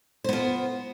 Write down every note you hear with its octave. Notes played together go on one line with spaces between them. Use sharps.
B3 F4 C5